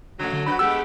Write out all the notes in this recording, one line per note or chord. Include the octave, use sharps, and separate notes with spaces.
C#3 F#3 A3
D3
D4 F#4 B4 B5
G#3 A3 B3 G4 E6